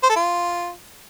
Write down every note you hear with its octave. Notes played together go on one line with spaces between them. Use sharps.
C5
A4
F4